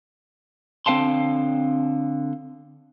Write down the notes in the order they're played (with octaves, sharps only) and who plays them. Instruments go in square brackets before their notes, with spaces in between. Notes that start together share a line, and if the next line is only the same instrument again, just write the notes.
[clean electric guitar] D3 C4 B4 F5 A5 C6